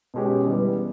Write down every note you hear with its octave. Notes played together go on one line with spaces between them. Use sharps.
B2 G#3 C#4 G4
E3 G3 B3